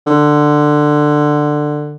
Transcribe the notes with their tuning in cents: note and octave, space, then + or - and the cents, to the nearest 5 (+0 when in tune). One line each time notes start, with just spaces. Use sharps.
D3 +15